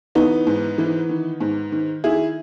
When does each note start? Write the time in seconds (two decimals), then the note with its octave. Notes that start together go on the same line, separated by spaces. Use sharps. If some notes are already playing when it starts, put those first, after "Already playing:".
0.15 E3 B3 D#4
0.47 G#2
0.78 E3
1.09 D#3
1.40 G#2
1.72 D#3
2.04 D#3 E4 G#4